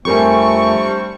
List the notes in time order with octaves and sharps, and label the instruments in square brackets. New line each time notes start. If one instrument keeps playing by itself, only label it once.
[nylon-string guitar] F2 A#4 G#5 [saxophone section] G3 C4 D4 [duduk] A3 [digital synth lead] C#6